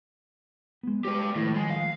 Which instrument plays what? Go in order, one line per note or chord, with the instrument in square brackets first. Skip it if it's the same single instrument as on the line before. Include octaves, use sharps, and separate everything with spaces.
[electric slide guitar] G#3 B3
[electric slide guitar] G#3 C#5 G5 [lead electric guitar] G4 B4
[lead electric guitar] A2 [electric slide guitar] D#3 F3
[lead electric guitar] G#3
F5